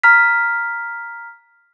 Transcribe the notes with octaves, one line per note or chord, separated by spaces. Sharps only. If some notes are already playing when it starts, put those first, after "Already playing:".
A#5 F6 B6